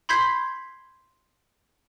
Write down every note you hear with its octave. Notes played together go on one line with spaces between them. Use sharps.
B5 C6 G6 G#6 B6 C7